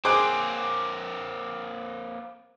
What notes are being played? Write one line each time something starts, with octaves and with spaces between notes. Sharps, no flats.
A#3 C4 G#4 C5 D6 F#6 D7